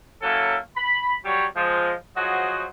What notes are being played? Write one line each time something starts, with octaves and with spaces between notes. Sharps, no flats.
F#3 A#3 C#4 E4 A4
B5
F#3 G3 C#5
F3 G#3
F3 F#3 F#4 G#4 C5 D#5